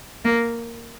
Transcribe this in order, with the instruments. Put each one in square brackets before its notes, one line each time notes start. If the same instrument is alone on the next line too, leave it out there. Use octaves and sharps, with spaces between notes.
[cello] A#3